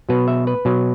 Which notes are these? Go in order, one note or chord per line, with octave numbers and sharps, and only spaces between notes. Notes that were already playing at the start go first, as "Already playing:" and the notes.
B2 F#3 B4
E5
B4
B2 F#3